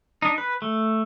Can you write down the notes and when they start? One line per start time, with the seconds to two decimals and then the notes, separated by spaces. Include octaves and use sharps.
0.22 D4 D#4
0.38 B4
0.62 A3